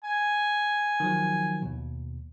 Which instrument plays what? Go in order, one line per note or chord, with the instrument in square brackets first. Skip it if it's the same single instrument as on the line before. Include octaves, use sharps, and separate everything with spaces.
[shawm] G#5
[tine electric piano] D#3 F3 F#3
D#2 B2